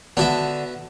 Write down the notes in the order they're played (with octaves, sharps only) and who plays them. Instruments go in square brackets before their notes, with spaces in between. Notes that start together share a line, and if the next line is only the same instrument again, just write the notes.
[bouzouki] D3 [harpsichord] B3 F#4 E5